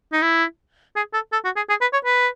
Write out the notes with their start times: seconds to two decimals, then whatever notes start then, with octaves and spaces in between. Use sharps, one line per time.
0.13 D#4
0.22 E4
0.96 G#4
1.13 A4
1.33 A4
1.45 F#4
1.56 G#4
1.69 G#4
1.81 B4
1.93 C#5
2.05 B4